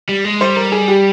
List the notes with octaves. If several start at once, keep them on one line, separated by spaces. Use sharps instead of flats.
G3
G#3
G3 C5
A#4
G#4
G4